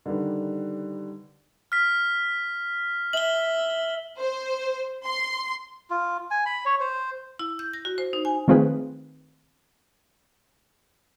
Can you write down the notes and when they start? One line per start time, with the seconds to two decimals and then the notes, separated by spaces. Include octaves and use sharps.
0.06 D3 D#3 G3 B4
1.72 F6 B6
3.13 E5 F#7 G7
4.18 C5
5.05 C6
5.90 F4
6.31 G#5
6.46 B5
6.65 C#5
6.80 C5
7.39 E4
7.59 G6
7.73 A#6
7.85 F#4
7.98 C5
8.13 D#4
8.25 G#5
8.48 D#3 A3 C4 F4 G#4 B4